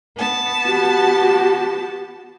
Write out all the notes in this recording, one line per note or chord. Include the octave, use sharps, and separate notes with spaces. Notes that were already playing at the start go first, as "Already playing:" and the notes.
B3 A5
F#4 G4